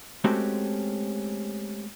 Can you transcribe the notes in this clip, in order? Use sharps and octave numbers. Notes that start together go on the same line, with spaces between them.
G#3 A3 C4 C#4 F#4 G4